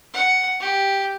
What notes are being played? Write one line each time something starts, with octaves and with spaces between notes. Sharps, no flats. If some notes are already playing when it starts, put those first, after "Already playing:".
F#5
G4